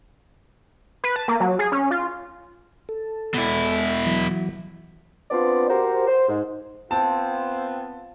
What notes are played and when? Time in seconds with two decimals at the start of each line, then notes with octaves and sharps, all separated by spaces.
1.04 B4
1.16 A5
1.28 A#3
1.40 F#3
1.59 G#4
1.72 C#4
1.91 F4
2.89 A4
3.34 B2 E4
4.06 E3 F#3
5.31 B3 C4 D4 F4 D5
5.69 F#4 G4 A#4 C5
6.07 C5
6.29 G#2
6.91 B3 C4 F4 A5